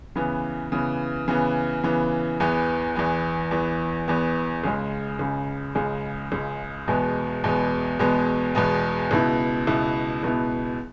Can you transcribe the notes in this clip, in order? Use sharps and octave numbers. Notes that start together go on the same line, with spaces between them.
C#3 E3 B3
C#3 E3 B3
C#3 E3 B3
C#3 E3 B3
E2 E3 B3
E2 E3 B3
E2 E3 B3
E2 E3 B3
C#2 C#3 G#3
C#2 C#3 G#3
C#2 C#3 G#3
C#2 C#3 G#3
E2 B2 G#3 B3
E2 B2 G#3 B3
E2 B2 G#3 B3
E2 B2 G#3 B3
C#2 B2 B3 E4
C#2 B2 B3 E4
C#2 B2 B3 E4